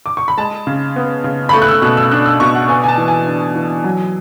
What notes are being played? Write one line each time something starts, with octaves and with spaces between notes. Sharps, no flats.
D6
C#6
B5
G#3 A5
C#3
B3
C#3
B5
A3 C#6
F#6
E6
B2 F#6
E6
D4 F#6
E6
B2 C#6
F#5
B3 G#5
G#5
A5
E3
G#5
D4
E3
F#3